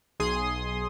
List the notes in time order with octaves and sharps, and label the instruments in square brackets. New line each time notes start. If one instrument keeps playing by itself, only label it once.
[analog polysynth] B1 G#4 C6 D#6